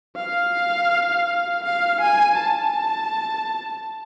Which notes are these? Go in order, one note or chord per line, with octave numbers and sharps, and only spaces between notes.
F5
F5
G#5
A5